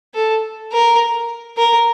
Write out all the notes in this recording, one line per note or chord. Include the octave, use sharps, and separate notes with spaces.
A4
A#4
A#4